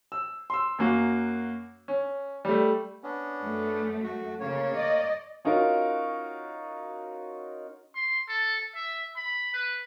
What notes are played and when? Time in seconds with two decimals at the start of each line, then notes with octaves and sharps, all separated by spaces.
0.12 E6
0.50 C6 E6
0.79 F#2 A#3 F#4
1.88 C#4
2.45 G3 A3
3.03 B3 C#4 D4
3.43 F#2 A3
4.03 F#4
4.40 C#3 A#3 C#5
4.77 D5 D#5
5.45 C#4 D#4 F4 F#4 A#4
7.95 C6
8.28 A4
8.75 E5
9.17 B5
9.53 B4